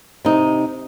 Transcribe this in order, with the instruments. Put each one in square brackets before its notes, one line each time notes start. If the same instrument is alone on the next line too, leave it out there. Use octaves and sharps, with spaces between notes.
[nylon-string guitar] C3 D#4